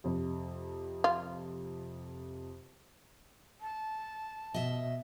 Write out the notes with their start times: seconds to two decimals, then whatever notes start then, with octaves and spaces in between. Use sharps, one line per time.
0.04 F2 C3
1.04 F4
3.61 A5
4.54 B2 D#5 E5